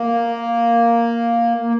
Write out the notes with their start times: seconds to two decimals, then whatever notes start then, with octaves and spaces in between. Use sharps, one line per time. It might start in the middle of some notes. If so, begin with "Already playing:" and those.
Already playing: A#3
1.64 A#3